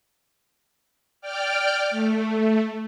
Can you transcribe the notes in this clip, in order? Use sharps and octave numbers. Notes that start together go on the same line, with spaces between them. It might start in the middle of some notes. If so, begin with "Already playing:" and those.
D5 G5 D6 F6
A3